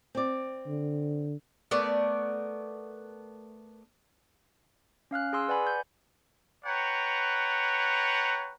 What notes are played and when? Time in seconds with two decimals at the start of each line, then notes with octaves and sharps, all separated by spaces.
0.15 C4 D5
0.67 D3
1.71 A3 B3 A#4 D5
5.11 C#4 F5 F6 F#6
5.33 G#4 G#5 C6 E6
5.48 B4 D5 F#5 G#5 B5
5.67 G6
6.65 B4 C#5 F#5 G5 A#5